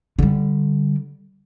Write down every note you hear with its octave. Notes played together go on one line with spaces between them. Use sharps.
D3 G3